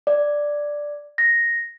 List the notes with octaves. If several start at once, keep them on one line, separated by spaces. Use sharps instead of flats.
D5
A#6